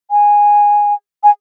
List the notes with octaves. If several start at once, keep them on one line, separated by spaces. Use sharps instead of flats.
G#5
G#5